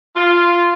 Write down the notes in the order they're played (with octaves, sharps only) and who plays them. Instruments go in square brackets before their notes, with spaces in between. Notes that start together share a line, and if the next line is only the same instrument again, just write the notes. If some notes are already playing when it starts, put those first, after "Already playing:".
[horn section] F4